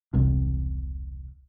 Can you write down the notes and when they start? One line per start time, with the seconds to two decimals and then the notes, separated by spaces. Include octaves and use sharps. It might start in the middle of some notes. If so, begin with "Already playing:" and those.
0.13 E1 C2 C3